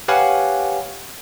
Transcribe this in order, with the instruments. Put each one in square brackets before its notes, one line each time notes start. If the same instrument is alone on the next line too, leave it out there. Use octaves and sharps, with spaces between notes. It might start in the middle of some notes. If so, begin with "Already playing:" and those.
[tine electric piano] G4 B4 C#5 F5 F#5 G#5